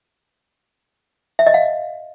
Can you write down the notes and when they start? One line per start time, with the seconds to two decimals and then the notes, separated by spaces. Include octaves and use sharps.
1.39 E5
1.47 D#5
1.54 F5